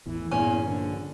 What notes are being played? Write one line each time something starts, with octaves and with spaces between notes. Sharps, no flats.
A1 E2 A2 E3
E2 G2 A#2 C#4
A#1 D3